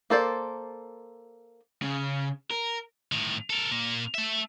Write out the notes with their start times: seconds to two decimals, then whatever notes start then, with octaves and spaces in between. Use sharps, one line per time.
0.10 A#3 A4 C5 D5
1.82 C#3
2.50 A#4
3.12 A2 D#3
3.50 A4 A#4
3.71 A#2 A#3
4.14 A3 E5